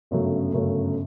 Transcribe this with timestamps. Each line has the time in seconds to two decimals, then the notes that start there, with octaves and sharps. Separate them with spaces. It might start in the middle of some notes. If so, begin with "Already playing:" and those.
0.11 G1 F#2 C#3 F#3 A3
0.53 G1 F#2 C#3 F#3 A3